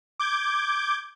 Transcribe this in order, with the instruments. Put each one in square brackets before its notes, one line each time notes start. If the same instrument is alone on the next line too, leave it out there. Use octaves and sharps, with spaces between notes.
[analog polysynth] D6 G6 G#6